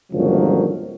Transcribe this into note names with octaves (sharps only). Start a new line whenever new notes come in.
G1 C#2 A#2 D#3 F3 F#3